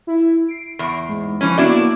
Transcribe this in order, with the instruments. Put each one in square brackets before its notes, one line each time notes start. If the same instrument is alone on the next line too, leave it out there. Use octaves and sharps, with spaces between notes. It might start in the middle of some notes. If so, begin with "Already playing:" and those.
[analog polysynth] E4
C7 D7
[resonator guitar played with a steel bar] E2
[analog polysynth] G#2
[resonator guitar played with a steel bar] E3 C#4 [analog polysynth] F3
[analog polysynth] A#3 B3 F#4 [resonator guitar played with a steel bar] D4 E4 D5